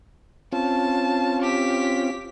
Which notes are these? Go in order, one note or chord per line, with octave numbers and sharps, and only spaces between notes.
C4 C#4 F4 A5
G4 B6